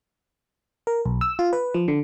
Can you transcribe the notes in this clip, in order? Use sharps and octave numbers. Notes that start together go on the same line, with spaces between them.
A#4
B1
E6
F4
B4
F3
D3